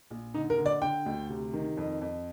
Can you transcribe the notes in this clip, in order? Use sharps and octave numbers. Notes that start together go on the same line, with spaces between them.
A#1
D3 D#4
A#4
D3
D5
D3 G5
D2
C3
D#3
F2
F2